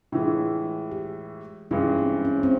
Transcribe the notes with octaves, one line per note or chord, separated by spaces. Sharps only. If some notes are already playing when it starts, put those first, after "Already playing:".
A2 E3 G#3 F4
G4
G2 E3 G#3 C#4
C4
C#4
C4